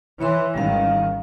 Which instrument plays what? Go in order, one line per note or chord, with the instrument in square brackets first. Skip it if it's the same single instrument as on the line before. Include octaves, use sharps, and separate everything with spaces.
[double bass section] E3 [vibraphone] C#5 E5 C6
[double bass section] G#1 D#3 [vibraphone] G3 C#4 F5